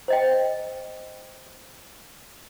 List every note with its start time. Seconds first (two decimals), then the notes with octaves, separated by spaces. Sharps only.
0.08 C5 D#5 G5